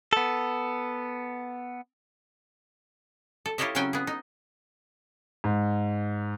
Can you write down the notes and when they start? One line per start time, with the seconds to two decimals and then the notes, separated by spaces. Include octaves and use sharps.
0.13 B3 A4
3.46 A4
3.58 E4 F4 G4 C#5 D#5 E5
3.75 C#3 F#3 C4 C#4 G5 G#5
3.93 B3 G#4
4.07 D#4
5.44 G#2